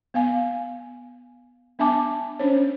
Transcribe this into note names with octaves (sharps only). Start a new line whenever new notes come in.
B3 F5 G#5
B3 D4 E5 G#5 A5 D6
C#4 D4 C5 C#5